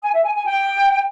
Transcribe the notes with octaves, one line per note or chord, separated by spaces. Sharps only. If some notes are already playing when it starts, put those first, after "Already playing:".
G#5
E5
G#5
G#5
G5